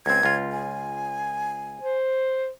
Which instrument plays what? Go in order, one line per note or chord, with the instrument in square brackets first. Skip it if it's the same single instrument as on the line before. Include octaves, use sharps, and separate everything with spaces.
[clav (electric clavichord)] C#2 C4 [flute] G#6
[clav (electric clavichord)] C#2 F4
[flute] G#5
[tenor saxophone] C5